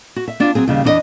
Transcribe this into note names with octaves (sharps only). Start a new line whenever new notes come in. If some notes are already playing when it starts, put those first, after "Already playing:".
F#4
E5
B3 D4 F4
F#3 C4 G#4
D#2 C#3 G3
E2 E3 D4 F4 D#5